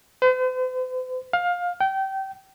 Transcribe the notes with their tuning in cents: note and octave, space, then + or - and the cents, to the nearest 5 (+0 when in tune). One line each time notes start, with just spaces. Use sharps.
C5 -45
F5 +20
G5 -25